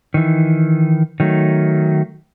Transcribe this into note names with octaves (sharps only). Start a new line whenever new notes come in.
D#3 E3
D#3 F#3 A3